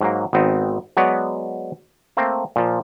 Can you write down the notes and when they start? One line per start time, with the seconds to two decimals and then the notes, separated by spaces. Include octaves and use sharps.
0.01 G#2 F#3 A#3
0.33 G#1 B3 C4 D#4
0.97 F#3 G#3 B3 B4 C#5 D5
2.17 A3 A#3 C4
2.56 A#2 F3